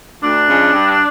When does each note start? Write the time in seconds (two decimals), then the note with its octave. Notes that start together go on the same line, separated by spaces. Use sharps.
0.23 D2 D4
0.48 C#3 F3 G#3
0.74 G2